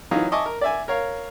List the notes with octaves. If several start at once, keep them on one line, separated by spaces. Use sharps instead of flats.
E3 F#3 D#4 F4 C#5
D#5 E5 G#5 A5 C#6 D6
A#4
D5 E5 G#5
A#4 C#5 F5